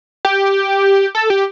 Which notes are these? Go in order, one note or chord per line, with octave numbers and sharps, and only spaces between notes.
G4
A4
G4